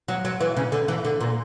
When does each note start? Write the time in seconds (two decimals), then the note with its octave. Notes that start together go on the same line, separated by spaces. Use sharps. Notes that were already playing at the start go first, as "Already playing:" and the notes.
0.08 F#3
0.25 F#3
0.41 E3
0.57 C#3
0.72 D3
0.88 E3
1.05 D3
1.20 A#2